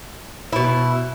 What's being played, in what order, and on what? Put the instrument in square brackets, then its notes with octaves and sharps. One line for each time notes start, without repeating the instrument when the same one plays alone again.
[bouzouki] B2 E4